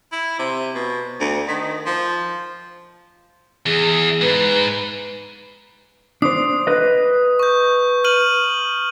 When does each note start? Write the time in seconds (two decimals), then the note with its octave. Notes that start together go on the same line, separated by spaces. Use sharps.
0.12 E4
0.39 C3
0.75 B2
1.20 D2
1.48 D#3
1.86 F3
3.66 E2 G#4
4.21 G#2 B4
6.22 D4 C5 D#6
6.67 B4 D#5
7.39 C#6 G6
8.04 F6 D#7 F#7